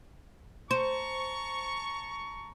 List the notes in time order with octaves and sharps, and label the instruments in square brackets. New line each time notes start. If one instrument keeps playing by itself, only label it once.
[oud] C5 [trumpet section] A5 A#5 C#6